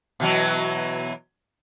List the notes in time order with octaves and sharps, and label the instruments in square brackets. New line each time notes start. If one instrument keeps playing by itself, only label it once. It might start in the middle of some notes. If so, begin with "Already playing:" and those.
[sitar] B2 E3 F#3